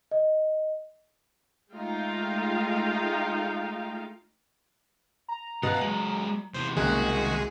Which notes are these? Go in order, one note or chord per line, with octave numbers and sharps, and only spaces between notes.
D#5
G#3 A3 D#4 F4 F5 G5
A#5
B2 F5 F#5
F#3 G#3 F#7
E2 C3 C5
F#1 C2 D#3 G#3 A#3 F#4 G#4